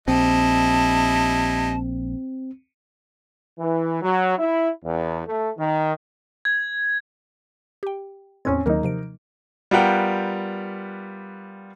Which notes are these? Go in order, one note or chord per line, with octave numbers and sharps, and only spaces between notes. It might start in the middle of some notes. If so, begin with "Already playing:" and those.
A#1 G3 C4 E4 D#5 A5
E3
F#3
E4
E2
A3
D#3
G#6
G4 G5
E2 A2 C4 C#4 G#6
D#2 D#3 F#3 A#3 D#4
C3 F3 D7
G3 B3 F4 A#4 F#5 G5